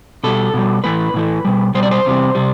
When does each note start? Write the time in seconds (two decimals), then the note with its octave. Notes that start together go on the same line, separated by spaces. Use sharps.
0.24 B2 G3 A4
0.54 B2 G3
0.84 A2 E3 A3 B4
1.14 A2 E3 A3
1.45 B2 G3
1.74 B2 G3 C5
1.83 D5
1.91 C5
2.05 E2 C3 G3
2.35 C3 G3